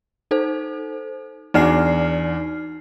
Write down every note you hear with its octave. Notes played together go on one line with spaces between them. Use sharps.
D#4 A4 C5
E2 D4 D#4 F#4 F6 C7